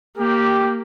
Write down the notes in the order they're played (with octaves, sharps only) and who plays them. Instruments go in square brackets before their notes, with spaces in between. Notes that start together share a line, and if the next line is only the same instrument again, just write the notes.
[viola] A#3 [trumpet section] G4